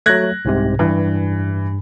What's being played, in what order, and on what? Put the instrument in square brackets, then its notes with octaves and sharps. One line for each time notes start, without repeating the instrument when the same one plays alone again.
[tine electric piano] F#3 A3 [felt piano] F#6 G#6 A#6
[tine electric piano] C2 G#2 C3
[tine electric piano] G2 [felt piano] E3